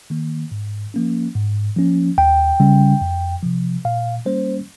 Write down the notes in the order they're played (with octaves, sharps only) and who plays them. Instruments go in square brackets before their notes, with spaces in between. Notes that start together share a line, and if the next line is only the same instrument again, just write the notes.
[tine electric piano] D#3 A#3
G#2
F3 A#3 C#4
G#2
F3 A#3 C#4
D#2 G5
C#3 G3 C#4
F2
C3 F3
A#2 F5
G3 A#3 C#4 C5